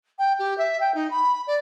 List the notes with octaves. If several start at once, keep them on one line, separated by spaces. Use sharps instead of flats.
G5
G4
E5
G5
D#4
B5
D5